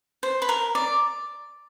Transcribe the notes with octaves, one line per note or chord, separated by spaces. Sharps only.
C5
B4
A#4
D5